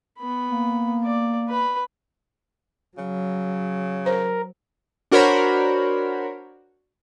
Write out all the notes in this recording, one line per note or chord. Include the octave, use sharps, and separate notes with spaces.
B3 B5
A#3
D5
B4 B5
C#3 F#3
A#4 C5
D4 F#4 A#4 C5 C#5 B5